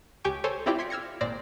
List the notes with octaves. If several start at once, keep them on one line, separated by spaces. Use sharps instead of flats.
C#2 G4 G5 G#5 C#6 D7
A4 C5 C#5 G#5
C4 E4 F4 G4 D5 G5
C6 G#6 B6 C#7
E6 F6 G#6 A#6 C#7
G#1 A#2 C5 D5 A#6